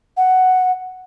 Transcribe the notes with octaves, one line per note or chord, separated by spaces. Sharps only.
F#5